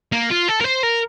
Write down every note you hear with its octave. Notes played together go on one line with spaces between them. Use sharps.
A#3
F4
A4
A#4
C5
A#4